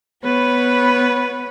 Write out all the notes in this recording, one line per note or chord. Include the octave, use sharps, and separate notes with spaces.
B3 B4 C#5 B5